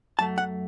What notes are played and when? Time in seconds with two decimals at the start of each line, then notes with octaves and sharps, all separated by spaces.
0.19 F#2 F#3 A3 A5
0.38 F#5